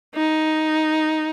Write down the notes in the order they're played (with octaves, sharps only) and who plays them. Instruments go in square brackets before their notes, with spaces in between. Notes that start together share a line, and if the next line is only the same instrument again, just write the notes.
[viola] D#4